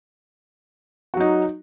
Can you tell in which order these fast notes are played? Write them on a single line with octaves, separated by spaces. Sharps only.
F#4 F#3 D#4